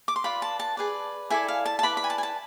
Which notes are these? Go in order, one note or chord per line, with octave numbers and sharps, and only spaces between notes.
D6
C6
F4 B4 D5 B5
A5
A5
G#4 B4 D5
E4 A4 D5 G#5
F5
A5
A5
E4 B4 D5 B5
B5
G#5
A5
G#5
A5